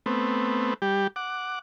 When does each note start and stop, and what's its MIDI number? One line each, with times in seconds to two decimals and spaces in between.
0.06 0.74 57
0.06 0.74 59
0.06 0.74 60
0.82 1.07 55
0.82 1.07 67
1.16 1.59 78
1.16 1.59 86